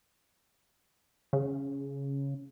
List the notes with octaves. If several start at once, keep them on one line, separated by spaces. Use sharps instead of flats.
C#3